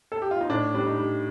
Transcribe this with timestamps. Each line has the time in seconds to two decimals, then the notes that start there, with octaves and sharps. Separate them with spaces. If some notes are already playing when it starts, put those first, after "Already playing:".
0.12 A4
0.22 G4
0.31 F4
0.41 D#4
0.49 A2 D4
0.74 G3 D4
0.86 D#4
0.98 G3